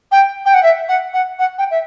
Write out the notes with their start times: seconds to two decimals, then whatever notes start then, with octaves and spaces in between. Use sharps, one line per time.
0.11 G5
0.45 G5
0.54 F#5
0.63 E5
0.88 F#5
1.13 F#5
1.39 F#5
1.58 G5
1.71 E5